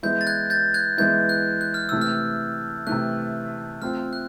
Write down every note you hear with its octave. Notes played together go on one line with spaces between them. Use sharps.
E3 G#3 B3 E4 G6
A6
F#6 G#6
G6 A6
F#6 G#6
E3 G#3 B3 E4 G6
F#6
F#6
F6
C3 E3 A3 E6
F6
C3 E3 A3 F#6
A3 C4 F4 F6
F#6